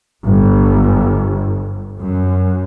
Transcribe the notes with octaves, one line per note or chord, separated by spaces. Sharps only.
G1
F#2